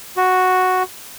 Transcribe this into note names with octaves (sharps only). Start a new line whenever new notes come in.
F#4